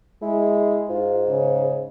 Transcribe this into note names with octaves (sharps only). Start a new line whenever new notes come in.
G#3 E4
G#2 F4
C#3